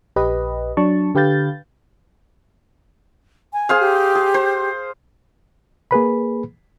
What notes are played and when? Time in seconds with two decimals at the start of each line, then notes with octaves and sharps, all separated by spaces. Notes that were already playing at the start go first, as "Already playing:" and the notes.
0.16 A#1 G4 B4 D#5
0.77 F#3 D4 A5 C#6
1.15 D3 G4 B4 F5 G6 A6
3.53 G#5
3.69 G#4 C5 F5
3.80 G4
4.15 G#4
4.34 C5
5.91 A#3 G#4 B4 B5